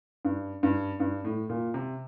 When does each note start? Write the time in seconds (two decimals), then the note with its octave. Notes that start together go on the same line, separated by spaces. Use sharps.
0.25 G2
0.63 G2
1.00 G2
1.25 A2
1.49 A#2
1.74 C3